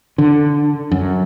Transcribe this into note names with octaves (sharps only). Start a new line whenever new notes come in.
D3
F#2